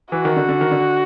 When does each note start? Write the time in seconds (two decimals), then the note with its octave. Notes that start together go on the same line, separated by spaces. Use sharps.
0.12 E3 F#4
0.25 D#3
0.36 D3
0.49 D3
0.61 D#3
0.71 D3